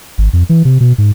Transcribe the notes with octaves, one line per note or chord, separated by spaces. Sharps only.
G#1
F2
E3
C3
B2
G#2